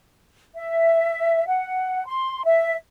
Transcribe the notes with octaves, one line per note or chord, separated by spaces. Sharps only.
E5
F#5
C6
E5